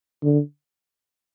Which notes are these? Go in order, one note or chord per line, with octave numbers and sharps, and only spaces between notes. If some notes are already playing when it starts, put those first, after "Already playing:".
D3